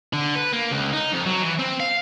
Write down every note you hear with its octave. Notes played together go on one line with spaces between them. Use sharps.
D3
B4
A#3
C#2
D#4
F2
F#3
E3
C4
F5